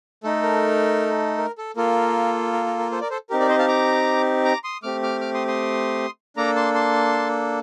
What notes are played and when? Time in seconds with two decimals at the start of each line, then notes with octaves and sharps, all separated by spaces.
0.23 A3 D#4 A4
0.42 A#4
1.38 A#4
1.58 A4
1.77 A#3 F4 A4 A#4
2.53 A#4
2.66 A#4
2.79 A#4
2.92 A4 C5
3.01 A#4 D5
3.10 A4 C5
3.30 C4 D#4 G4 A#4
3.40 A#4 D5
3.49 C5 D#5
3.59 F5 A5
3.68 A#5 D6
4.45 A#5 D6
4.64 C6 D#6
4.83 A3 C4 G4 D6 F6
5.03 D6 F6
5.21 D6 F6
5.34 C6 D#6
5.48 C6 D#6
6.37 A#3 D4 A4 A#5 D6
6.56 A5 C6
6.74 A5 C6